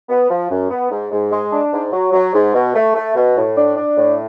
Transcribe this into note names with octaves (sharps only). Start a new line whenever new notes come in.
B3
F3
F#2
B3
G#2
G#2
G#3
D4
G#2
F#3
F#3
G#2
B2
A3
A3
B2
A2
D4
D4
A2